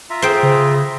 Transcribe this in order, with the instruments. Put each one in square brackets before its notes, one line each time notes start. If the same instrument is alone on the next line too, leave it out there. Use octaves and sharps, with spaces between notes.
[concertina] F4 E5 A#5
[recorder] G#4 [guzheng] C5 G5
[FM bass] C#3